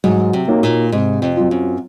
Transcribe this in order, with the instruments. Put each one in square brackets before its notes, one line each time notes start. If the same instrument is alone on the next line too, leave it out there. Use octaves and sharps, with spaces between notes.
[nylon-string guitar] G#2 [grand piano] F#3
[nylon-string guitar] C3
[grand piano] A#3 D#4 F#4 C#5
[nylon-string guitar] A#2
[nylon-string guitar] G#2 [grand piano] C3
[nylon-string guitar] F2
[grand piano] F#3 C4 F4
[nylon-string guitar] F#2